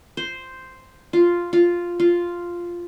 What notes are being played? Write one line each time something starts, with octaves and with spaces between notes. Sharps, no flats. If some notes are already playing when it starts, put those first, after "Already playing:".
C5
F4
F4
F4